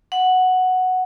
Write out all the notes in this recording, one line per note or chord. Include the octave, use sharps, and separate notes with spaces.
F#5